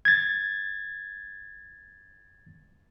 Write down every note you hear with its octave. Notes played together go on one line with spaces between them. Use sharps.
G#6 A6